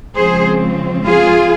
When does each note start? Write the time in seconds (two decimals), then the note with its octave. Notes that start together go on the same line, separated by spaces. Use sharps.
0.16 C#3 F3 G#3 C4 G#4 C5
1.06 F4 G#4